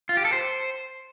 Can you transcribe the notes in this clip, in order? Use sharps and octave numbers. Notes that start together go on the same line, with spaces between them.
F4
G4
A4
C5